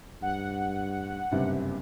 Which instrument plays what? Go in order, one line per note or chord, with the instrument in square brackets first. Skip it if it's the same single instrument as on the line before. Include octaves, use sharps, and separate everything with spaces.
[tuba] G2 [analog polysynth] F#5
[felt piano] F#1 G2 C3